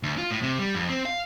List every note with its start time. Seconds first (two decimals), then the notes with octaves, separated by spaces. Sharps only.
0.03 D2
0.18 F4
0.31 A2
0.43 C3
0.59 G3
0.75 F2
0.89 C4
1.06 F5